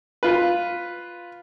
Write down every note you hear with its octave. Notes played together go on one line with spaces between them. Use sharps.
F4 B4